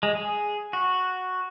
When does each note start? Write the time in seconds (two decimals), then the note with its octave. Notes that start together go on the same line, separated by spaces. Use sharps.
0.03 G#3
0.15 G#4
0.73 F#4